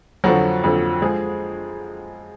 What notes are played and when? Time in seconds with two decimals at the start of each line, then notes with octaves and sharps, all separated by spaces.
0.24 F2 D3 F3 F#3 F#4
0.64 F2 D3 F3
1.02 F3 G#3 G#4